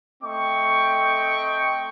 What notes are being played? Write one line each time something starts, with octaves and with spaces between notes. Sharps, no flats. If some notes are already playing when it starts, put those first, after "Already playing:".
A3 C4 D#5 G5 C#6